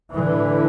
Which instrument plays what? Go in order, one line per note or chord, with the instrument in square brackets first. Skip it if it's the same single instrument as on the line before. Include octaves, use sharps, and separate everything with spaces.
[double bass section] A2 D3 E3